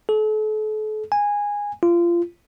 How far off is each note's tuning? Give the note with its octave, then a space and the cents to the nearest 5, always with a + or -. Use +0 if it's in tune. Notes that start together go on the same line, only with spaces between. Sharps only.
A4 -40
G#5 -15
F4 -25